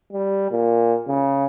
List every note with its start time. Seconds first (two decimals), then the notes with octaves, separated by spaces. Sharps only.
0.13 G3
0.51 A#2
1.08 C#3